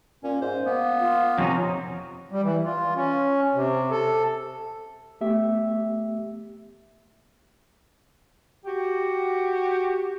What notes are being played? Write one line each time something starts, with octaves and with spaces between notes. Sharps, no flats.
A#2 C#4
G#2 C5
A#3 B3
F4
F2 C3 C#4 D#4
G3
E3
F4
C#4
C3
A4
A3 B3 G4 E5
F#4 G4